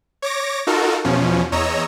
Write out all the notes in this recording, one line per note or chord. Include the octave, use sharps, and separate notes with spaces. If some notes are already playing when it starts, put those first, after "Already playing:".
C#5 D6 A#6
D#4 F4 F#4 A4 A#4
E2 B2 F3 C#4
E2 C#5 D#5 A#5 E6